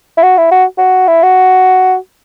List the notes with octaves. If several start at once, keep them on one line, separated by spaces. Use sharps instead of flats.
E4
F#4
E4
F#4
F#4
E4
F#4